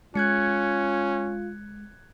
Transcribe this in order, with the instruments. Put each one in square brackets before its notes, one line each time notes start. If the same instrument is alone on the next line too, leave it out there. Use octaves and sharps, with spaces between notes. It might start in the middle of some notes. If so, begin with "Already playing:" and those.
[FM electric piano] G#3 [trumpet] C#4 [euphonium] F4 [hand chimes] F#6 G#6 C#7